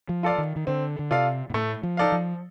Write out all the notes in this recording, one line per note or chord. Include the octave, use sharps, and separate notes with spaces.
F3
F4 A4 D5 F5
D#3
D#3
D3 C4
D3
C3 F4 A4 D5 F5
A#2
A2 A3
F3
D#4 A4 D5 F5
F3